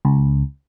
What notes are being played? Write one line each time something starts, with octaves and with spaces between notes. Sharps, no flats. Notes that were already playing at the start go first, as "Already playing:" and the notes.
C#2